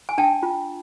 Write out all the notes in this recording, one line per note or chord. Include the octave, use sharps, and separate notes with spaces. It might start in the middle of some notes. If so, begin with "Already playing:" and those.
G#5
D4 G5 A5
F4